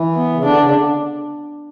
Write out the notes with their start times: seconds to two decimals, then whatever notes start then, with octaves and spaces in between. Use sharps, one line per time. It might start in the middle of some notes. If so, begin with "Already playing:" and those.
Already playing: E3
0.15 B3
0.34 C#3
0.44 D3 D4
0.59 C#3
0.74 D3